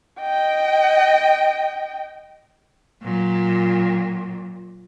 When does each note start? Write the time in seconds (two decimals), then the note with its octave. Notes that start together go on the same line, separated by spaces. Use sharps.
0.21 D#5 G5
3.02 A#2 F#3